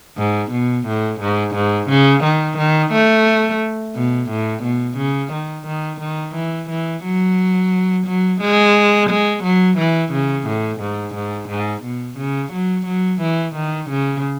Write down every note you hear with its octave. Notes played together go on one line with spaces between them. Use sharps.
G#2
B2
A2
G#2
G#2
C#3
D#3
D#3
A3
B2
A2
B2
C#3
D#3
D#3
D#3
E3
E3
F#3
F#3
G#3
G#3
F#3
E3
C#3
A2
G#2
G#2
G#2
B2
C#3
F#3
F#3
E3
D#3
C#3